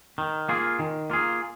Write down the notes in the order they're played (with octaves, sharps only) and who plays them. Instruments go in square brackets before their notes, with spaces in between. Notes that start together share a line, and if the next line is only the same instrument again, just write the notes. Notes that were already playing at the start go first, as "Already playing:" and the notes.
[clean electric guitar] D#3
A#3 F4 G#4
D#3
A#3 F4 G#4